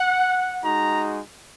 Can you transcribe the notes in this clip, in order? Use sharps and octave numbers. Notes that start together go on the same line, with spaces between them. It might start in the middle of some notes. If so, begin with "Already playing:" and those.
Already playing: F#5
G#3 D#4 F#4 A#5